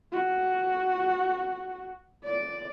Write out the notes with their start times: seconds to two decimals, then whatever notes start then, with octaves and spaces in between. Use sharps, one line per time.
0.12 F#4
2.24 D5